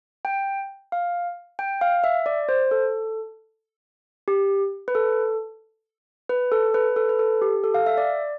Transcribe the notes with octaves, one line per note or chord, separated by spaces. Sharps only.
G5
F5
G5
F5
E5
D5
C5
A4
G4
B4
A4
B4
A4
B4
A4
B4
A4
G4
A4
F5
E5
D5